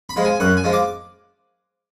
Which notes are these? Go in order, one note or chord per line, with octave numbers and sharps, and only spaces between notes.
B5
F3 G#3
G#5
F#2 F#5
G#5
F3 G#3
D6